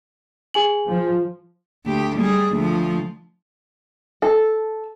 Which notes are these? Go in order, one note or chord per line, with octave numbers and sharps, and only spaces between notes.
G#4 G#5 F#7
F3
D2 G4
G3 G#4
D2 F3
A4